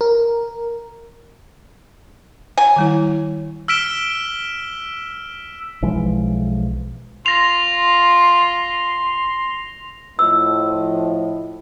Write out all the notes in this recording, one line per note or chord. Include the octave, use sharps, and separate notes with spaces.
A#4
F#3 G#5
D#3 G3 E4
E6 F6 B6 D7 E7 G7
B1 E3 F3 G#3
F4 C6 A#6 F7
A2 F3 D#5 E6